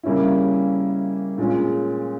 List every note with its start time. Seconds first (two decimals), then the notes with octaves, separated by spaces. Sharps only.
0.03 C#3 G3 A#3 C#4 E4
1.38 A#2 G#3 C#4